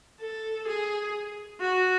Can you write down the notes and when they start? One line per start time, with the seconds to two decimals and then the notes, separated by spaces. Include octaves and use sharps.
0.21 A4
0.68 G#4
1.61 F#4